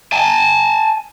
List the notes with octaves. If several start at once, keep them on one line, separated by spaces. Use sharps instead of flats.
G#5 A5